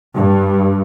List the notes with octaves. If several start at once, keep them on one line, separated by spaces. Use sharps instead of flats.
G2